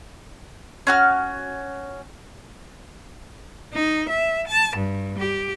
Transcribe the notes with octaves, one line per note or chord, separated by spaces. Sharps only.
C#4 F#4 F6
D#4
E5
A5
G2
G4